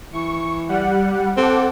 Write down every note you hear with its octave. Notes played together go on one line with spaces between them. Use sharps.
E3 C#6
G3 F#5
C4 A4 F#5 D6